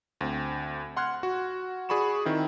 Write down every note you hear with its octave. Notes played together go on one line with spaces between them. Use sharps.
D2 C4
F#5 C6 F6 F#6 G#6
F#4
F#4 G#4 D5 B5 C#6 E7
D#3 C4 E4